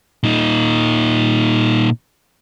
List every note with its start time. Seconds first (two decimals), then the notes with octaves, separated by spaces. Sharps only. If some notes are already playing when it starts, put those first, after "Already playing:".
0.23 A#2 D#4